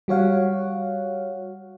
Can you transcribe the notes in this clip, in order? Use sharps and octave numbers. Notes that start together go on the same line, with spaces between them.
G3 F#4 C#5 F5 F#5